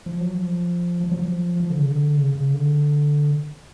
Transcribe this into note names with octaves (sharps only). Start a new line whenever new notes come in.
F3
F#3
F3
F3
F#3
F3
F3
D3
C#3
D3
C#3
C#3
D3